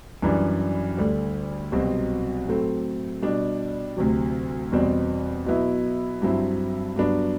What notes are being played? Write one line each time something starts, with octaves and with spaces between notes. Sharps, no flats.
F#2 E3 G3 D4
D2 D3 G3
C2 B2 F#3 C4
A2 F#3 A3 C4
B2 G3 D4
D2 C3 F#3
E2 B2 G3 C4
B2 F#3 B3 E4
G2 F#3 C4 E4
G2 F#3 B3 D4